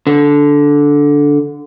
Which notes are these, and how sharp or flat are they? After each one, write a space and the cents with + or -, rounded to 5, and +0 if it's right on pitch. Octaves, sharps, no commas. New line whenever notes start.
D3 -10